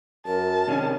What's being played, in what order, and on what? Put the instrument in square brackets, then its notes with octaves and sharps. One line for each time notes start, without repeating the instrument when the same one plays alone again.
[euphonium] F#2 [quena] A#4 [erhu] A5
[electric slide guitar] C3 C#4 D4 [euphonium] D#3